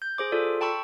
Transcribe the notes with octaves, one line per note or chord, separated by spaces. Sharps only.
G6
G#4 C5 D6
F4 A4 D5
G5 A5 B5 C#6 E6